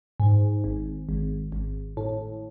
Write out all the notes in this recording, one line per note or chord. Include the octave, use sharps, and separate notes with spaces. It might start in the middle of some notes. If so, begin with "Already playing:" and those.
G#2
G#1
G#1
G#1
A2